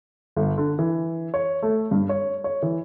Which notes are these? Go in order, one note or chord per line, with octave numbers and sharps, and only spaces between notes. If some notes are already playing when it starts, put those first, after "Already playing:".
G1
D3
E3
C#5
A3
G2
C#5
C#5
E3